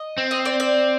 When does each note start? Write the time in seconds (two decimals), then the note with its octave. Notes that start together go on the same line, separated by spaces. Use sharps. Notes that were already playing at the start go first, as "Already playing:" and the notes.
Already playing: D#5
0.18 C4
0.31 D#5
0.45 D5
0.60 D5